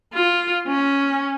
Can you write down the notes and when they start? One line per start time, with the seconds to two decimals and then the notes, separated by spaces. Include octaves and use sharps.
0.13 F4
0.67 C#4